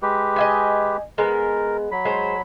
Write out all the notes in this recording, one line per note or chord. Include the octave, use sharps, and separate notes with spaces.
G#3 G4 B4
D#5 E5 G#5
G#3 B3 A#4
F#3 B5
G#3 C5